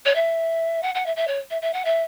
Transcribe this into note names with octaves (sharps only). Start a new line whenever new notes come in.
C#5
E5
F#5
F#5
E5
E5
C#5
E5
E5
F#5
E5